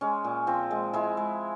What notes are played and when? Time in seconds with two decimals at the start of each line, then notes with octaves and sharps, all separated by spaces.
0.01 G#3 C#4
0.24 A#2
0.47 F3 C4
0.71 G#3
0.93 G#3 E4
1.17 G#3